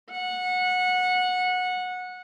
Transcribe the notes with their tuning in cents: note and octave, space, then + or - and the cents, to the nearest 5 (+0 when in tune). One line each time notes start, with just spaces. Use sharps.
F#5 -20